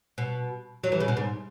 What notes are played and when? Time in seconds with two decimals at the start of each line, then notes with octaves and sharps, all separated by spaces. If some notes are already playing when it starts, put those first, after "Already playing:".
0.18 B2
0.84 F#3
0.92 E3
1.00 C#3
1.08 B2
1.17 G#2